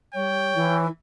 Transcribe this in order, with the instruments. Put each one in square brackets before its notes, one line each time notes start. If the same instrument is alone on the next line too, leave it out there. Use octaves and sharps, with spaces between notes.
[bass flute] G3 [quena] C#5 [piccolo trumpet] G5
[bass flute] E3